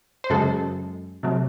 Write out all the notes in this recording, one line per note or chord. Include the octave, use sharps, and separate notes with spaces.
C5
F#2 C#3 G#3 A4
C3 F#3 A3